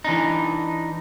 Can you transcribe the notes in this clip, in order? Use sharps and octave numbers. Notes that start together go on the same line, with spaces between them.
E3 D4 D#4